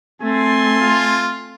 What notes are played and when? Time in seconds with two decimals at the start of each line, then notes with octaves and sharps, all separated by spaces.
0.22 A3 C4 G#5 A5 C6
0.82 F4